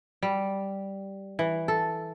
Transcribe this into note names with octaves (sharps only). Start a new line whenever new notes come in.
G3
E3
A4